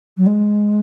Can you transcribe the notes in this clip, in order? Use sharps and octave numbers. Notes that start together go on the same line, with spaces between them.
F#3
G#3